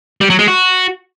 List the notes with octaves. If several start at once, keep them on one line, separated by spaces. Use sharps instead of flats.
G3
F#3
G#3
F#4